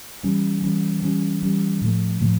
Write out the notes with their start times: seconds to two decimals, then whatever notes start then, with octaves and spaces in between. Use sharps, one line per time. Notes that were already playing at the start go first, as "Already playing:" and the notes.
0.23 E3 G3 C#4
0.63 E3 G3 C#4
1.02 E3 G3 C#4
1.43 E3 G3 C#4
1.82 A2 F3 A3
2.21 A2 F3 A3